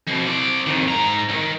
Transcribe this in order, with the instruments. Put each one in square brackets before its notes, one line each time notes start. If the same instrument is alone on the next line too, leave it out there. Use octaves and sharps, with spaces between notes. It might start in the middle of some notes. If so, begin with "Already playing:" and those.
[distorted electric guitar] F2 B2
C4 D5
F2 D#3
G#2 A#5
C#2 D#3